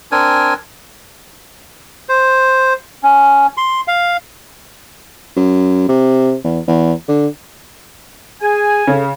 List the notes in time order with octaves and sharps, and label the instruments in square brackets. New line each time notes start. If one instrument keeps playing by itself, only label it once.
[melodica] C4 D4 A#4 G#5
[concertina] C5
C#4
C6
F5
[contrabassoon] F#2
C3
E2
E2
D3
[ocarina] G#4 [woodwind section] G#5
[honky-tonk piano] C#3 [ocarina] A4